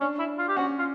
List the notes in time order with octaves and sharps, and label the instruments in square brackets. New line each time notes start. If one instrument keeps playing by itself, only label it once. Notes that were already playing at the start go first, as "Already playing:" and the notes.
[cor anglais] C#4 [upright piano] D4
[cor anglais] E4
F4
G4
[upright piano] C#4 [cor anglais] F#4
[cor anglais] F4